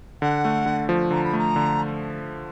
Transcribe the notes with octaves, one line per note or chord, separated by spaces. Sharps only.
D3 F#5
A3
D3
F3
D3 A#5
B5
A3 A#5
D3